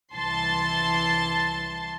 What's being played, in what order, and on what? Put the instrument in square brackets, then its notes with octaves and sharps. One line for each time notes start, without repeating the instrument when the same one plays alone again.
[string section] C2 E3 A5 C6 A6